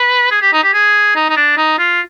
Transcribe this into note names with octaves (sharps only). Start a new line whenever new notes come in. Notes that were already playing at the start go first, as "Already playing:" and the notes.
Already playing: B4
G#4
G4
D#4
G4
G#4
D#4
D#4
D4
D#4
F4